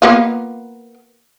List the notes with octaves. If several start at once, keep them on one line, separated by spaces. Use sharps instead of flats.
A#3 B3 F4